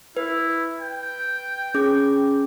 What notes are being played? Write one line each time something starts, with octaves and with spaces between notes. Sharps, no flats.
E4 B4
G5
C#4 G#4 D6